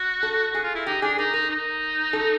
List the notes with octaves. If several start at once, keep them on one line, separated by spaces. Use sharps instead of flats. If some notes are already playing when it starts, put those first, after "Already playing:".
Already playing: F#4
A4
F#4 G#4
F4
E4
D#4 G4
D4 G#4
D#4 A#4
D#4 A#4
D#4
A4